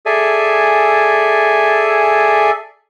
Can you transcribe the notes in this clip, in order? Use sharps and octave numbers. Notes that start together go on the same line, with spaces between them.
G#4 A4 D5 E5 G#5